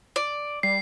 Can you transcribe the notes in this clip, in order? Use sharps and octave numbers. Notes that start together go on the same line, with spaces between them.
D5
G3 C7